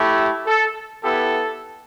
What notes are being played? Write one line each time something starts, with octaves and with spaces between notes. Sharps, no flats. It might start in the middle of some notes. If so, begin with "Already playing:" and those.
Already playing: A3 E4 G4
A4
B3 E4 G4 A4